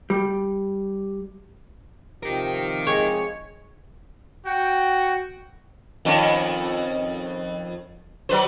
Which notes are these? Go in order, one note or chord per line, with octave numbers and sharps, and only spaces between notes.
G3
C3 F3 D#4 G4 A#4
G#3 C#5
F#4 G5
F2 D#3 C#4
F#3 B4 C5